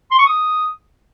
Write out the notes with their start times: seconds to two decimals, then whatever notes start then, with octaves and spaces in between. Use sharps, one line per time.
0.11 C6
0.19 C#6
0.26 D#6